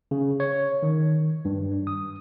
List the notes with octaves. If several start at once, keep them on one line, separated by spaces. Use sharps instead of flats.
C#3
C#5
D#3
G2
D#6